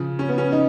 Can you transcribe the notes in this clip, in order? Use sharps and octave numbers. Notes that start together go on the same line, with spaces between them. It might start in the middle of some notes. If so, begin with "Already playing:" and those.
Already playing: C#3 F3
C#4
B3
C#4
D#4